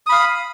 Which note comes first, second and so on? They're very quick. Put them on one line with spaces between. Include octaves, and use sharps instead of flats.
D#6 B5 F5